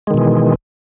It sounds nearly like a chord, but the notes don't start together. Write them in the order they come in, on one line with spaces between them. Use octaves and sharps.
G#3 D#3 B2 E3